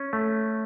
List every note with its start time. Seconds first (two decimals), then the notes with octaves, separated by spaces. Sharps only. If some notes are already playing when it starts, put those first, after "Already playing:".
Already playing: C#4
0.13 A3